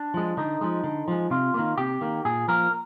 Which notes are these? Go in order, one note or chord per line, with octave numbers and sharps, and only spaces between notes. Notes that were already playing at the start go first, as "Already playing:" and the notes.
Already playing: D4
F3 G#3
D3 D#4
F3 G#3
D3
F3 G#3
C3 F4
D#3 A#3
C3 G4
D#3 A#3
A#2 G#4
F3 A#3 A#4